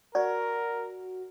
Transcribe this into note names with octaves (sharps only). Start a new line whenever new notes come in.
F#4 A#4 D5